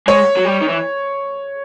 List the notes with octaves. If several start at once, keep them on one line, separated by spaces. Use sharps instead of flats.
G#3 C#5
F#3
G3
D#3
E3